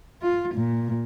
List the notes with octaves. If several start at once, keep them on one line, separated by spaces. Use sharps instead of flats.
F4
A#2